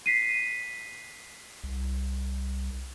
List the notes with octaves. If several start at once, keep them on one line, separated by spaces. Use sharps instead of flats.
B6 C7 D#7
C2